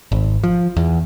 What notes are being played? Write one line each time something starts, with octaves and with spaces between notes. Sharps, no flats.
G#1
F3
E2